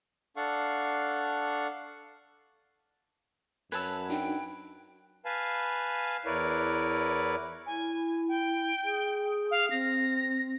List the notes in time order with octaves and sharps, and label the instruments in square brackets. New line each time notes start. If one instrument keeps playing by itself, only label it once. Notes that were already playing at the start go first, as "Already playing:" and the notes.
[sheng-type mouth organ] D4 A4 F5 F#5 C#6
[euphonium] F#2 [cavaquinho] B4 A5 [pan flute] C#5 [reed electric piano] E6 G#6
[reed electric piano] D4 D#4 F#4 [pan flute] G5
[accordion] B4 F5 G#5 A5 B5
E2 E4 A#4 B4 C#5 D5
[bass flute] E4 [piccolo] G#5
[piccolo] G5
[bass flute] G#4
[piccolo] F5
[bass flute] C4 [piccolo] A#6